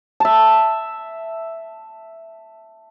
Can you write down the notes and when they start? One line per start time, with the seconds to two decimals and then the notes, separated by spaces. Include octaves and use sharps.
0.20 E5 A5